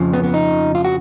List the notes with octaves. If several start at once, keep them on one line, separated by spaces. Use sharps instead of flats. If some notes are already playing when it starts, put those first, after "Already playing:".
Already playing: F2 C#3 F3
B3
B3
D#4
F4
F#4